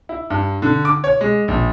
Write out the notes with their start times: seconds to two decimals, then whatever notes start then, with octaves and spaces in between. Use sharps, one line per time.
0.09 E4
0.30 G2
0.62 D3
0.85 D6
1.04 C#5
1.21 G#3
1.48 A#1